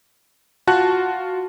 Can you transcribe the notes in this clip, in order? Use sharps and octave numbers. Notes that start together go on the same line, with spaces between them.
F4 F#4 A5 F#6